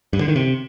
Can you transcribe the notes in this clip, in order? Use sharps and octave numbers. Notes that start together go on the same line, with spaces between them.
G2
D3
D#3
C3